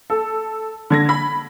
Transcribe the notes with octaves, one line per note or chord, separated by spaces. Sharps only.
A4
D3 G#6 A#6
B5